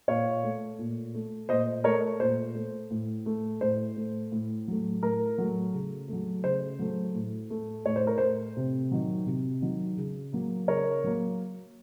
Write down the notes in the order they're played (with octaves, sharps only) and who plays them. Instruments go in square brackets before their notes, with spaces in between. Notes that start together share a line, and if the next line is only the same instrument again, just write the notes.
[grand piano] A#2 C#5 F5
A3
A#2
A3
A#2 C5 D#5
A3 A#4 C#5
A#2 C5
A3
A2
A3
A2 C5
A3
A2
F#3 A3
A2 A#4
F#3 A3
C#3
F#3 A3
C#3 C5
F#3 A3
A2
A3
A2 C#5
C5
A#4
A3 C5
C3
D#3 F#3
C3
D#3 F#3
C#3
F#3 A#3
C#3 A#4 C#5
F#3 A#3